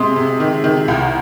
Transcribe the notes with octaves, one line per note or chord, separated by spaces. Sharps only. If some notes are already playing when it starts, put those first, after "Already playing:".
Already playing: C3 G#3 C6 D#6
C3
D#3
D#3
C2